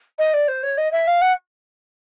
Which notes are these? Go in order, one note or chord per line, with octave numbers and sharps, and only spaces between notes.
D#5
D5
C5
C#5
D#5
E5
F5
F#5